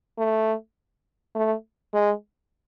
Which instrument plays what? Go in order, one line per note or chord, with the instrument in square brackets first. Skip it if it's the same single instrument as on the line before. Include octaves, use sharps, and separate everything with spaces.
[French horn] A3
A3
G#3